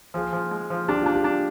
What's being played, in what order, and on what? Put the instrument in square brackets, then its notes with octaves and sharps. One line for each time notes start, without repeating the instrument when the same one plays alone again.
[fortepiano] F3 [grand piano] G#4
[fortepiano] F3
G#3
F3
[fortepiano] D4 [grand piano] G4
[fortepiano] D4 [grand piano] F4
[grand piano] G4
[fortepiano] D4